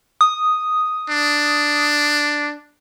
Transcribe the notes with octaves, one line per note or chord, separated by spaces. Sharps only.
D#6
D4